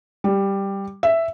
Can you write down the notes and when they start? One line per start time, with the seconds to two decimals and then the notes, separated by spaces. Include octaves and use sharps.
0.24 G3
1.03 E5